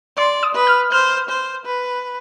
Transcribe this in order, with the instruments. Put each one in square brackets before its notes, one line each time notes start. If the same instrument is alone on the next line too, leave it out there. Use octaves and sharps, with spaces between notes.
[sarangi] D5 [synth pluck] C6
[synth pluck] D#6
[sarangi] B4
[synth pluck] F6
[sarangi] C5 [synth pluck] F6
[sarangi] C5
B4